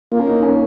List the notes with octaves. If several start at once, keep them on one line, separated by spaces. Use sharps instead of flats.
A#3 F4
C#4
D#4
C#4